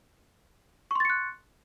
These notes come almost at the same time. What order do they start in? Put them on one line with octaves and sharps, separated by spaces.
C#6 C6 A6 C#7 F#6